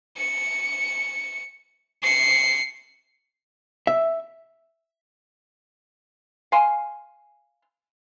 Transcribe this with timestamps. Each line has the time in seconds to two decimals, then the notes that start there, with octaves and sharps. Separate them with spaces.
0.17 C#7
2.03 C7 C#7
3.87 E5
6.52 F5 G#5 C6